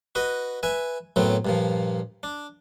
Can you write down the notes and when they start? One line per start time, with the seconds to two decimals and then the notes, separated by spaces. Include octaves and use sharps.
0.15 F#4 B4 D#5
0.63 B4 E5 G#5
1.16 F#2 A2 F#3 A3 B3 C4
1.45 G2 A#2 F3
2.23 D4